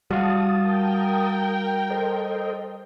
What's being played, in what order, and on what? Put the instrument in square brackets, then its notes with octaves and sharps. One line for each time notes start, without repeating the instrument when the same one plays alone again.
[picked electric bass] G3 [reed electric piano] F#4 F5 F#5 [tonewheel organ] A5 D#6
[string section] A#4 G5
[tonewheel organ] A4 C5 D#5